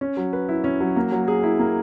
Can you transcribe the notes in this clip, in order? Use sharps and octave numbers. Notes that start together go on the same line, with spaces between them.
C#4
F#3
B4
E4
C#4
F#3
A#3
F#3
G#4
E4
A#3